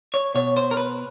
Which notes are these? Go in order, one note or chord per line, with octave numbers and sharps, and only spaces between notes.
C#5
B2 C#5
C5
A#4
B4